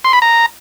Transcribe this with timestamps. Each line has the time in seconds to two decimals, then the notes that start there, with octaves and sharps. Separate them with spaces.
0.05 C6
0.13 B5
0.22 A#5